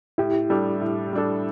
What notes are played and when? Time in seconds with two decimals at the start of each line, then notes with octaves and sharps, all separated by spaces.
0.18 A2 E4 G4
0.50 G3 D4 A4
0.81 A2
1.13 G3 D4 A4